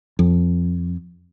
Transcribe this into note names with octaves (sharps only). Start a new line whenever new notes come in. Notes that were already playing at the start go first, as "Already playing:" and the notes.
F2